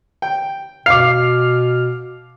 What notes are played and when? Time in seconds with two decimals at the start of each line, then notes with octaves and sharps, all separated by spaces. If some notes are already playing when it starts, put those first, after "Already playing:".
0.22 G5
0.86 B2 F5 D6 F6 C7